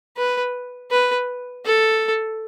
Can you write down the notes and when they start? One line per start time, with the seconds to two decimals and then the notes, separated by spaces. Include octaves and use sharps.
0.17 B4
0.91 B4
1.66 A4